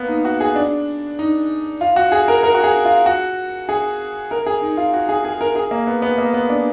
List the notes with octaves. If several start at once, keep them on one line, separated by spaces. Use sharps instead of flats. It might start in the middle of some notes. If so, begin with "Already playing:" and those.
Already playing: A#3 B3
D#4
F#4
G#4
D4
D#4
F4
F#4
G#4
A#4
A#4
F#4
G#4
F4
F#4
G#4
A#4
G#4
D#4
F4
F#4
G#4
G#4
A#4
G#4
A#3
B3
B3
A#3
B3
D4